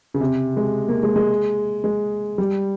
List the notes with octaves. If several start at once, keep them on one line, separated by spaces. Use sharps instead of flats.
C#3
C3
G#3
A#3
G#3
G#3
G#3
G3